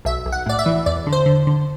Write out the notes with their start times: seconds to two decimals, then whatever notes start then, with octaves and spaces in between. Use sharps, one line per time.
0.05 B1 E5
0.26 B1
0.32 F#5
0.46 A2 D5
0.59 E5
0.66 E3
0.86 E2 D5
1.07 D3
1.12 C5
1.26 D3
1.47 D3